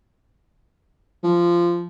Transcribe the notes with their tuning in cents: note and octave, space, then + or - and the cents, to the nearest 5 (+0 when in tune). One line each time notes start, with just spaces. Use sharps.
F3 -15